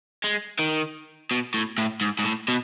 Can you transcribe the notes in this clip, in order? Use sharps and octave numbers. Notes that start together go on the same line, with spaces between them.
G#3
D#3
B2
A2
A2
G#2
G#2
A2
B2